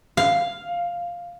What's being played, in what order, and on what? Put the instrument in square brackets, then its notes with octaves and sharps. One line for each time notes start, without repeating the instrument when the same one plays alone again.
[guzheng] F5